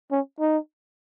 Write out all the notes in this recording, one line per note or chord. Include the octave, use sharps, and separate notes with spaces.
C#4
D#4